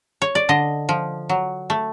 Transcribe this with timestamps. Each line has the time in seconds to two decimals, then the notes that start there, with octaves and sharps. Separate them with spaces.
0.22 C#5
0.35 D5
0.49 D3 D#5
0.89 F3
1.29 F#3
1.70 A3